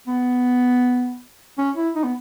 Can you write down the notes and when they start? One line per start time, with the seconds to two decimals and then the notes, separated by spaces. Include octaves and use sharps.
0.07 B3
1.58 C#4
1.76 E4
1.96 D#4
2.04 B3